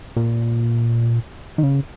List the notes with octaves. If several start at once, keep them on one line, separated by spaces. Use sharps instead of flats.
A#2
D#3
C#3